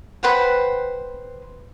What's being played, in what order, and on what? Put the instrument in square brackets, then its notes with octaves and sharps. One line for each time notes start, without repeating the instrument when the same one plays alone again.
[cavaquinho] B4 C5 F#5 G5